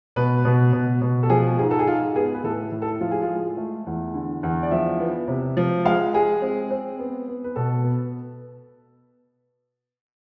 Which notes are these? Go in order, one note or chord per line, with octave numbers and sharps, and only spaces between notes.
B2 B4
B2
B2
B2
A4
F3 G#4
G#2 G#4
A4
G#4
G#2 F4
B3 G#4
B4
A2 A4
A2
A4
F3 F4
G#4
F4
G#3
A3
E2
D3
E2
D5
F3 E5
B3
C3
F3
G#3 F5
G#3 G#4
C4
C4
B3
B3
B4
B2 A4
B3